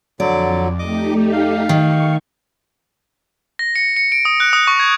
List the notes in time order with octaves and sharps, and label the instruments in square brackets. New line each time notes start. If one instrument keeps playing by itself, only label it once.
[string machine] F2 [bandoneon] D3 F#3 [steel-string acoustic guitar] D5
[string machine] A3 D#4 G4 [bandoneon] D#5 D6
[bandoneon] F5
[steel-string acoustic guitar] D#3 [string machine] C#6
[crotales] A#6
C#7
C#7
D7
D#6
F#6
D#6
C#6
G#6